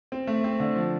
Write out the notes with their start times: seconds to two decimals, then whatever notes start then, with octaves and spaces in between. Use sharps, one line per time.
0.12 C4
0.27 A3
0.44 C4
0.60 D3
0.76 F3